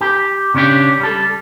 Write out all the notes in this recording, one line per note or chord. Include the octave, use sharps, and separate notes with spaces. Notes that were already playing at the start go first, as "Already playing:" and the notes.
G4
C#3 C#4 D4 G4
G3 A4